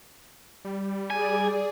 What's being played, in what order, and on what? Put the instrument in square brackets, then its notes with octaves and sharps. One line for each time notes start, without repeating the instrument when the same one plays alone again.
[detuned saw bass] G3
[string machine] G#4 D5 [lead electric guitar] G#5